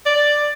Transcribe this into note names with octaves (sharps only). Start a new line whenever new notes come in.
D5